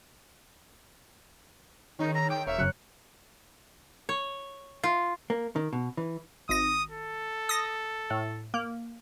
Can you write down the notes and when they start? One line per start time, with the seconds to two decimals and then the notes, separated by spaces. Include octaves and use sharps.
1.99 D#3 C#4 D#4 G#4
2.14 A#5 C6 E6 A#6
2.30 G5 D6 G6 D7
2.47 E1 A#4 C#5 E5 F5
2.58 F#2 C#3 F#3 F#6 C7 C#7
4.09 C#5
4.84 F4
5.30 A#3
5.56 D#3
5.73 B2
5.97 E3
6.49 G#1 D#6 A#6
6.91 A4
7.49 D#6 A#6
8.10 A2
8.54 A#3